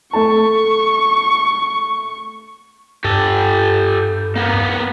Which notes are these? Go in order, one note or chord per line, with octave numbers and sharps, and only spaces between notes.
A3 A4 A5 C#6
G2 G4 A4
A#3 B3